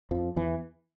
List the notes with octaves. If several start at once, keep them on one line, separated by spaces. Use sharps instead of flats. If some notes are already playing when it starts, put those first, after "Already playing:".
F2 F3
E2 E3